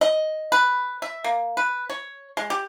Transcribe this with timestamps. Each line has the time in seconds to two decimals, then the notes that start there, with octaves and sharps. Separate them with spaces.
0.01 D#5
0.52 B4
1.02 E5
1.24 A#3
1.57 B4
1.90 C#5
2.37 G#3
2.50 G4